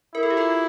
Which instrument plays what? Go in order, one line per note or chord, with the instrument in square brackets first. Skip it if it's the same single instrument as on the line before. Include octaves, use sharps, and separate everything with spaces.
[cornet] E4 [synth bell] A#4
[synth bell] A4
G4
F4 A4